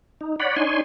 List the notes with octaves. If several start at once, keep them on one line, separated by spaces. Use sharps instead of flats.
D#4
C#5 D5 F#5 B5
D4 D#4 C#5 G#5 C6